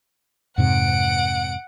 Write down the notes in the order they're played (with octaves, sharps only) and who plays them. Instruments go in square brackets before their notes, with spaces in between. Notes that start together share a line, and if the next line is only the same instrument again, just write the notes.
[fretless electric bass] F2 G#2 C3 [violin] F#5 D7